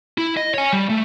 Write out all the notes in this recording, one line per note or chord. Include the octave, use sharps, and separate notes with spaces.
E4
D#5
C#5 G#5
G3
A3